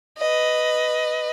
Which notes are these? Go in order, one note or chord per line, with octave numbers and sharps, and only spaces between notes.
B4 D#5